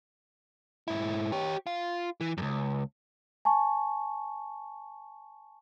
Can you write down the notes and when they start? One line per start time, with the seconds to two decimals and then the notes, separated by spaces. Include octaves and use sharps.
0.88 G#2 E4
1.32 G4 C#5
1.67 F4
2.21 E3
2.38 C#2 F#2
3.45 G#5 A5 C#6